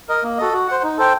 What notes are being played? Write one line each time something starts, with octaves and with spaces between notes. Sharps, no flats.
A#4 D#5
A#3
F#4 A4 D#5
F#4
C5 F#5
D#4
A4 C5 G5